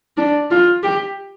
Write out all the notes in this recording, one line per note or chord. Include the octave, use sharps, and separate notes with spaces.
D4
F4
G4